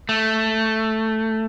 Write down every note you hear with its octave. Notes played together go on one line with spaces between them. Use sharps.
A3